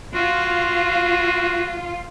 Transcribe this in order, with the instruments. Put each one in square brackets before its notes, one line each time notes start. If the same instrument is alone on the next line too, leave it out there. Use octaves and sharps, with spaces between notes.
[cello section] F4 [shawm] F#4